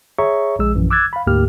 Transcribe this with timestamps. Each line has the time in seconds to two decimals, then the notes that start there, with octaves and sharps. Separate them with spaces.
0.19 G#4 C#5 E5 A#5 C#6
0.59 A#1 G#3 G#4 E6
0.75 A#1 F#2 E3
0.91 D6 E6 F#6 G#6 A6
1.13 F5 B5
1.27 D2 G#2 A#3 G4 F6